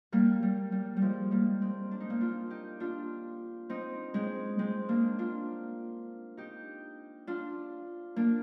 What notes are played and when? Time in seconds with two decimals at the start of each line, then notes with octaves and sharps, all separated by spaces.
0.12 G3 A#3
0.43 G3
0.72 G3
0.97 G3
1.02 F3 G#3
1.31 G3 A#3
1.61 G#3 C4
1.91 D4
2.00 D#4
2.10 A#3 D4
2.21 D4 F4
2.50 D#4 G4
2.80 D4 F4
3.69 C4 D#4
4.14 G#3 C4
4.59 G#3 C4
4.89 A#3 D4
5.19 D4 F4
6.37 D#4 G4
7.27 D4 F4
8.16 A#3 D4